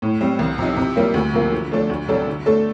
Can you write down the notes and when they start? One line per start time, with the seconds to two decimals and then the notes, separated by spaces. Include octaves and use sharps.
0.02 A2
0.21 G3 C4
0.39 C2
0.58 C3 F3 C4 D#4
0.77 C3
0.96 G3 A#3 F4
1.14 D2
1.34 C3 F3 A#3 F4
1.52 D3
1.71 F3 A3 D4 A4
1.89 D2
2.08 C3 G3 D4 A4
2.27 D3
2.46 A3 D4 A4